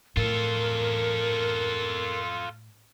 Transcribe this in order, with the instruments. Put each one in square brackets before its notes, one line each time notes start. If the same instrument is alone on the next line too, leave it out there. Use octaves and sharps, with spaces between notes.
[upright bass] A2 [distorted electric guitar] F4 A4 [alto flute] A#4